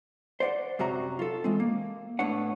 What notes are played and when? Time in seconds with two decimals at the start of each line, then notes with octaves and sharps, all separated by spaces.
0.40 C5 D5 F5 F#5
0.79 F#2 C3 F#3 F#4 A#5
1.19 F4 A4
1.44 E3 G#3 C4
1.60 A#3
2.19 A2 B3 D4 C#5 F#5